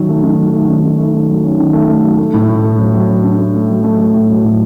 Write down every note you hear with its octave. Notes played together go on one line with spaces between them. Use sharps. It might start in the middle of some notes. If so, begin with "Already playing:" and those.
Already playing: D#3 F#3
A3
D#3
F#3
A3
D#3
D#3
A3
D#3
F#3
C#4
D#3
A3
A3
F#3
A3
A2
A2
A3
F#3
F#3
F#3
D4
A3
A3
F#3
A3
A3
A2
F#3
A2